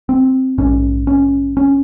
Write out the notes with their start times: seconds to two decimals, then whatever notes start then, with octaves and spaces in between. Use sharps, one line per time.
0.09 C4
0.58 A#1 G#2 C#4
1.07 C#4
1.57 C#4